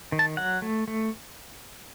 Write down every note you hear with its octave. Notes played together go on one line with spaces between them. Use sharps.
D#3
A5
F#3 F#5
A3
A3